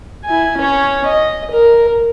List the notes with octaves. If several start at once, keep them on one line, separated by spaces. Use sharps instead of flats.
E4 G#5
C#4 C#5
D#5
A#4